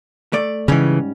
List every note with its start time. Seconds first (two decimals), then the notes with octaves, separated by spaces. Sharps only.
0.33 A3 D5
0.68 G#2 C#3 E3 G3 C#4